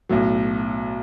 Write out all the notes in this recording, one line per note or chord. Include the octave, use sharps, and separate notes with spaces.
B1 A2 F#3